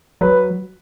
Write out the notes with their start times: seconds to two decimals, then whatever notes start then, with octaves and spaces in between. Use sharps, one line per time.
0.21 F#3 B4